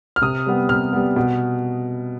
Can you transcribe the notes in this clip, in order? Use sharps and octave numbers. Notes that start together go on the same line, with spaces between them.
F6
C3 D#6
G3 B3
C3 F6
G3 B3
B2